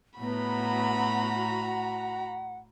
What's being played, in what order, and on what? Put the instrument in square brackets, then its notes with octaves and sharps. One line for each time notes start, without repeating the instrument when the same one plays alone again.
[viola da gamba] A2 [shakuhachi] B3 [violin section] F#4 A#5 [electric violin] B5
[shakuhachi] F#5